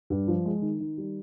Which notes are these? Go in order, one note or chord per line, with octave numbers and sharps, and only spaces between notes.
G2
F3
G#3
D#3
D#3
G3